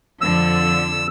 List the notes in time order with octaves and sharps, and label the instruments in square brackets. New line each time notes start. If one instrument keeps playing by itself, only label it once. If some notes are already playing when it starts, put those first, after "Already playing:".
[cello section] F2 D3 F3 [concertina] E6